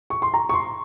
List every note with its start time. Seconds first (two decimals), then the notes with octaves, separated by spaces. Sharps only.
0.10 C#6
0.22 C6
0.34 A#5
0.49 C#6
0.54 C6